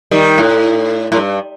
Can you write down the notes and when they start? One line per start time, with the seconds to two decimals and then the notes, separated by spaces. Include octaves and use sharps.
0.11 D#3 G3
0.38 A2
1.12 A2
1.17 G2